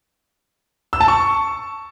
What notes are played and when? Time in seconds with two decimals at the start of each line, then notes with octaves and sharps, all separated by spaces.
0.93 E6
1.01 A5
1.08 C#6